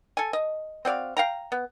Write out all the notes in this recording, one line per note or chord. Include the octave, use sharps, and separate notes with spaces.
A4 G#5
D#5
C4 F#4 D5 F5
F5 G5 A#5
B3